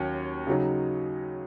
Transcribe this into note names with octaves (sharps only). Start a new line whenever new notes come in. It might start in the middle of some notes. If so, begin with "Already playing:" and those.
Already playing: D#2 F#3 C#4
C#3 F#3 D#4